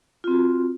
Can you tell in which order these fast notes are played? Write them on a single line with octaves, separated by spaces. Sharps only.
F4 C4 F#4